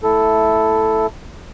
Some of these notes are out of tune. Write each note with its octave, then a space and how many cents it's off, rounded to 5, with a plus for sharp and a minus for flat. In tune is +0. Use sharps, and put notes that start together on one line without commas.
A3 +0 E4 +0 A4 +0